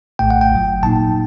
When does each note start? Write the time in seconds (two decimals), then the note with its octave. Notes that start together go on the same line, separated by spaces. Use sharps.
0.19 A#1 A2 A3 G5
0.30 F#5
0.41 G5
0.52 G1 G2 F#3
0.83 A#2 F#3 A#3 D#4 A5